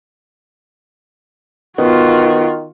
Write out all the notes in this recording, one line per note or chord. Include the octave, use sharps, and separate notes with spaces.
D#3 B3 F4 F#4